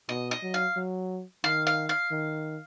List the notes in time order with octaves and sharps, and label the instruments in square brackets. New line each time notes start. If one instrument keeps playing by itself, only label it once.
[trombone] B2 [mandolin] D#5
[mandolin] D#5
[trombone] F#3
[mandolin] F5
[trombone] F#3
[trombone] D#3 [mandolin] F5
[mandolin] F5
F5
[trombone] D#3